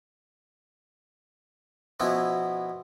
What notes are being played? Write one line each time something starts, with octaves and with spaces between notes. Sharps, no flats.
B2 F3 B3 C#4 E4 F#4